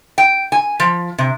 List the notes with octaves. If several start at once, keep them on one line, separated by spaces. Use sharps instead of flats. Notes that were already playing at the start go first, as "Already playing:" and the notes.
G5
G#5
F3
C3